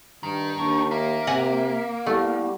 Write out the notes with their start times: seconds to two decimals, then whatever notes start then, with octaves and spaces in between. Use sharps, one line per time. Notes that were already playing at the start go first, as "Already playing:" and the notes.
0.23 G2 D#3
0.58 D#2 D4 C#6
0.91 A#3 E5
1.27 C3 F#5 G#5 A#5
2.06 G3 A3 B3 E4 G4